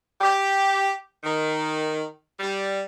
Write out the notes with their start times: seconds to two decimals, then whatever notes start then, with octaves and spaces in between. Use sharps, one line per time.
0.21 G4
1.24 D#3
2.40 G3